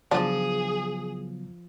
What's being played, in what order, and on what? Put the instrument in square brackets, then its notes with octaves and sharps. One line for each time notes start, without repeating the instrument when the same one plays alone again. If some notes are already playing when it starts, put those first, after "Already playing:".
[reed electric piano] C#3 F#3 B3 [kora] F3 [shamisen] D4 [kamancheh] G#4